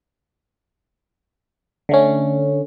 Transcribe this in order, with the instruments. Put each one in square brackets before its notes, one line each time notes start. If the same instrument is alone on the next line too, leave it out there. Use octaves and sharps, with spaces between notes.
[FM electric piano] D3 A3 C#4